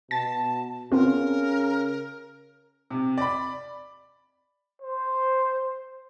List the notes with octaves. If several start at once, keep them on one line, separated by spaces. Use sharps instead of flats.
B2 A5 A6
C#3 B3 C4 F4 A#4
C3
D5 B5
C5